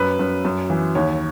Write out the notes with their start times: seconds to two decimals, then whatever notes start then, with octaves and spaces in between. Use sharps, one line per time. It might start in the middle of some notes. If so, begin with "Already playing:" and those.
Already playing: F#2 B4
0.19 F#2
0.45 F#2
0.70 E3
0.95 D#2 C#5